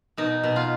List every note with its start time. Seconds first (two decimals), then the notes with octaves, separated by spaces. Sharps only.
0.17 B2 D#4
0.44 B2
0.56 F4